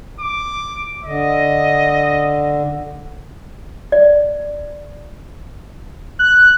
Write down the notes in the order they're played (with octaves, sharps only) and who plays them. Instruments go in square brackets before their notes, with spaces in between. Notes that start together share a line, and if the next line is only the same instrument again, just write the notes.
[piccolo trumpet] D6
[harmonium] D3 [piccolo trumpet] D#5
[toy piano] D5
[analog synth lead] F#6